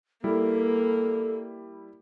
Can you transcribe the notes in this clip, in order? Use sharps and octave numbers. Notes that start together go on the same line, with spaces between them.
G3 A#3 E4 A4